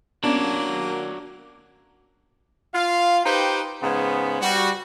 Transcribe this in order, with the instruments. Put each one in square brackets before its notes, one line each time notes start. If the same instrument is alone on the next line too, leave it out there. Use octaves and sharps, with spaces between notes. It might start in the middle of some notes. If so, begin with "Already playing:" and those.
[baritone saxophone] A#3 [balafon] B3 C#4 [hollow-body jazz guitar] D4 [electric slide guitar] F#4 C#5 D5
[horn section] F4 F5
D#4 G4 B4 C5 G5
G#2 C#3 B3
G3 F#4